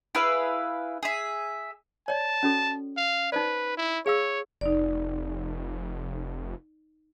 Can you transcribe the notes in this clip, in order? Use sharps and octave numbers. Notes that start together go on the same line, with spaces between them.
E4 G#4 B4 F5
G#4 E5
C#5 D5 A5
C#4 F#4 A4
F5
D#4 B4 C5 D5
E4
G#4 C#5 F5 E6
F1 D#4 D5